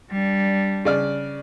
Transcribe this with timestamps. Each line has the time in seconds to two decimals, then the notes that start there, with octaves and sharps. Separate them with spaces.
0.11 G3 D4
0.85 C#3 D5 F6